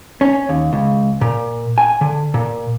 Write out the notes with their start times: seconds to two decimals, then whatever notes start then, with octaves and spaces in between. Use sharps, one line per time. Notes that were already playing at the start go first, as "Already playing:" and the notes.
0.21 C#4
0.49 D#2
0.73 C#2
1.21 A#2
1.78 G#5
2.01 D3
2.34 A#2